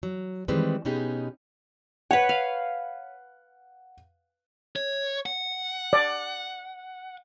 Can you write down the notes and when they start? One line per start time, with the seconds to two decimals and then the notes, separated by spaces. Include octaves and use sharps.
0.03 F#3
0.48 D#3 E3 G3 G#3 C4 B4
0.85 B2 B3 C#4 D#4 G4 G#4
2.11 B4 C#5 F#5
2.29 F5
4.76 C#5
5.26 F#5
5.93 D5